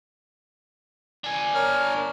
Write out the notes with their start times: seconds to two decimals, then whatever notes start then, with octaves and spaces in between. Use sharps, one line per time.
1.24 D4 G#5
1.55 A#4 C#5 F6